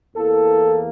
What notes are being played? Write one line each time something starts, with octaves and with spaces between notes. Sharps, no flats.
E2 E3 A#3 A4